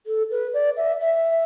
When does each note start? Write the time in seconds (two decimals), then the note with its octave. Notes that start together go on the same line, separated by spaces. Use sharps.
0.06 A4
0.31 B4
0.54 D5
0.77 E5
1.01 E5